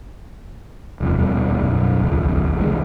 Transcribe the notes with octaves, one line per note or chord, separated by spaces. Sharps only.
E1 C2 F2
D#1 B2 G3
B1 F#2 B2
D#1 G#1 C#2 F3
C2 D#3 E3 G#3